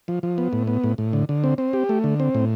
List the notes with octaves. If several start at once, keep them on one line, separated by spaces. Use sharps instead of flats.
F3
F3
B3
A2
B3
A2
A2
D3
D3
C4
C4
G4
A3
D3
C4
A2